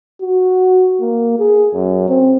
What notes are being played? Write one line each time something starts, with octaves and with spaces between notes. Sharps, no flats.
F#4
A#3
G#4
F#2
C4